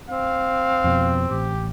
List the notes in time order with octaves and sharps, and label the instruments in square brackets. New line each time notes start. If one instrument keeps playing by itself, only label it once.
[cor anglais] C4 [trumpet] F5
[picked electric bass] F2 B2
[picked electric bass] A1 [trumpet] G4